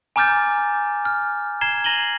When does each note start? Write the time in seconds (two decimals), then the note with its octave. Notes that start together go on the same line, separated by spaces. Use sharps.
0.16 G#5 A#5 D6 F6 G6 A6
1.05 F6
1.61 A#5 G#6 C7 E7 G7
1.84 A#5 A#6 D#7 F#7 G7